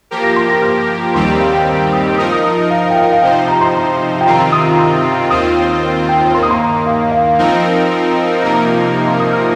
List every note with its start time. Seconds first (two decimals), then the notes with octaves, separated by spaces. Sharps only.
0.11 F3 A#3 G4 A#4
0.24 A#6
0.36 C6
0.49 A#6
0.62 F6
1.14 D#2 D#3 G3 C4 G4 C6
1.28 A#5
1.40 F5
1.53 G5
1.67 A#5
1.92 D#6
2.18 F3 D#4 A#4 D#6
2.32 D#6
2.44 D#6
2.57 D#5
2.70 F5
2.91 G5
2.96 F5
3.12 F5
3.22 C3 F3 D#4 C5 G5
3.48 A#5
3.61 C6
3.73 A#5
4.21 G5
4.26 C3 D#3 C4 F4 A#5
4.52 D#6
4.72 A#5
4.79 C6
5.30 D#2 D#3 C4 F4 C5 D#6
6.09 G5
6.34 D#2 D#3 A#3 C6
6.43 D#6
6.51 C6
6.60 A#5
6.86 F5
7.12 F5
7.38 F3 C4 D#4 A#4
8.42 C3 F3 A#3 D#4 A#4 A#5
8.93 A#5
9.08 C6
9.19 D#6
9.33 F6